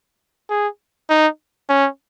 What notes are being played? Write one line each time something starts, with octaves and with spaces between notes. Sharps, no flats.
G#4
D#4
C#4